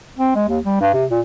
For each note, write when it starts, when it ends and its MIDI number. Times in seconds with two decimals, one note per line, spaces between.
0.18 0.33 60
0.36 0.46 56
0.49 0.59 39
0.65 0.77 55
0.81 0.89 43
0.94 1.05 48
1.11 1.20 46